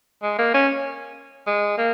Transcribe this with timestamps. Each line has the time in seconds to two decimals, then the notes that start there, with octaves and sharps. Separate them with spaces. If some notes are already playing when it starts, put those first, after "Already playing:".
0.23 G#3
0.38 A#3
0.54 C#4
1.47 G#3
1.78 A#3